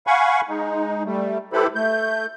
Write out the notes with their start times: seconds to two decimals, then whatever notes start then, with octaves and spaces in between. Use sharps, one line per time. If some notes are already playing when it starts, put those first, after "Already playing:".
0.07 F5 F#5 G#5 B5 C#6
0.49 G#3 D#4
1.05 G3 A3
1.53 E4 G4 A4 B4 C5 B5
1.75 A3 G6